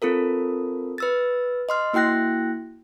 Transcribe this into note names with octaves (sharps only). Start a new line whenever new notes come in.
C4 F4 A4 A#4
B4 E6 A6
D#5 C6 F6
A#3 E4 F#4 G5 F#6 A#6